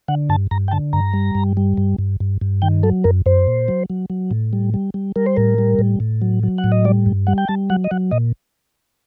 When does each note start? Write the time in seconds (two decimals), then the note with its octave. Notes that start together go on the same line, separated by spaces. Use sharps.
0.08 D3 F#5
0.30 G2 A5
0.51 G2 A#5
0.68 G5
0.71 D3 A5
0.93 G2 A#5
1.13 G3
1.35 G2
1.57 G3
1.77 G2
1.98 G2
2.20 G2
2.41 G2
2.62 D#3 G5
2.83 F#3 A4
3.04 F#2 A#4
3.26 F#2 C5
3.47 A#2
3.68 F#3
3.90 F#3
4.10 F#3
4.31 A2
4.53 G3
4.74 G3
4.94 G3
5.16 G3 A#4
5.26 C5
5.37 A2 A#4
5.58 G3
5.79 A2
6.00 A2
6.22 F#3
6.43 F#3
6.58 F#5
6.64 A2
6.72 D#5
6.85 G3 D5
7.06 G2
7.27 G3 F#5
7.38 G5
7.49 G3 A5
7.70 F#3 F#5
7.84 D#5
7.91 F#3 F#5
8.11 A#2 D#5